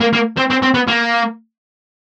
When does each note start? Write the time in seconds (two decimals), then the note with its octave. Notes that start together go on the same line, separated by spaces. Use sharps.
0.01 A#3
0.13 A#3
0.37 C4
0.50 C4
0.62 C4
0.74 B3
0.88 A#3